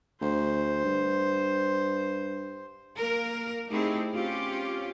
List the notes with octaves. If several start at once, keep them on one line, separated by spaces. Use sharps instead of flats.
D2 C5
G2
A#3 A#4
A3 C4 D#4 E4 G4 G#4
C4 C#4 F4 G4